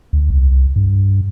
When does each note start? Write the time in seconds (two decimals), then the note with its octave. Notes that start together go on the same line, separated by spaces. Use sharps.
0.13 D2
0.30 C2
0.76 G2